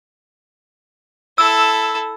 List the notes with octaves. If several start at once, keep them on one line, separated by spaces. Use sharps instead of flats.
E4 A4 E6